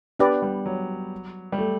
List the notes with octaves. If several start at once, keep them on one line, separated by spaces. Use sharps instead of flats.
B3 D4 G4 B4 D5
G3
F#3
G3
A3